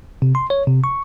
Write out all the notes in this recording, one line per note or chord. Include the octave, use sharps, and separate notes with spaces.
C3
C6
C#5
C3
C#6